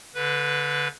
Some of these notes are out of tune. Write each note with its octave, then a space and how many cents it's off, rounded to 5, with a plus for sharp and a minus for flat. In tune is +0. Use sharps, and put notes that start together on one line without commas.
D3 -20 B4 +0